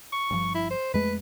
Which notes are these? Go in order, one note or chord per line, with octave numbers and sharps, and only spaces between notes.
C#6
G1 G2 F3
E4
C5
F2 G#3 A3 B4